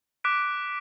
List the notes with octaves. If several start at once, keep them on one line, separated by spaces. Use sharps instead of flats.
D6 F#6 B6 D7